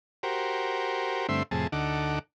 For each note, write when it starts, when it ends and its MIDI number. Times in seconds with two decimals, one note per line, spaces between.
0.23 1.27 66
0.23 1.27 67
0.23 1.27 70
0.23 1.27 72
1.29 1.43 43
1.29 1.43 50
1.29 1.43 57
1.29 1.43 60
1.29 1.43 76
1.29 1.43 84
1.51 1.67 41
1.51 1.67 45
1.51 1.67 48
1.51 1.67 68
1.51 1.67 81
1.72 2.19 38
1.72 2.19 50
1.72 2.19 63
1.72 2.19 69
1.72 2.19 78
1.72 2.19 86